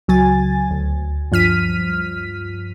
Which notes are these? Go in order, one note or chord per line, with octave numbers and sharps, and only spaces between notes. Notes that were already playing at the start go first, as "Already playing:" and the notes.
C#2 F#3 G#5 A6
D2
G2 F3 F6 B6 D#7